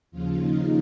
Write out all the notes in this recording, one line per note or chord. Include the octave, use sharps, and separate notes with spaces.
D#2 C#3 F3 F4
D#4